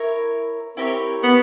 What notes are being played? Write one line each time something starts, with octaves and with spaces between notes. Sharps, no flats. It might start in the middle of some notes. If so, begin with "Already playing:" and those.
Already playing: E4 A#4 C#5
C4 E4 G4 A#4 C#5
B3